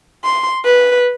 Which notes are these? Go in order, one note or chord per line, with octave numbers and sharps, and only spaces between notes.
C6
B4